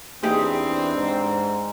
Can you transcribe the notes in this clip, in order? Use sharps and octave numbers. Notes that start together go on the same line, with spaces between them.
E2 C4 D4 D#4 G4 G#4
G#2